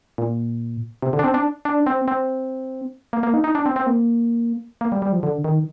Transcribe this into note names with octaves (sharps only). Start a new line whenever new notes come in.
A#2
C3
D3
D4
C4
D4
D4
C4
C4
A#3
A#3
D#4
D#4
D4
C4
C4
A#3
A#3
G3
G3
F3
D3
D#3